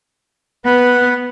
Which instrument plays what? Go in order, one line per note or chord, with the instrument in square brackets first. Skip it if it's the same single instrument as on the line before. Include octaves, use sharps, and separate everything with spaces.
[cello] B3 [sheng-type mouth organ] B4 F#5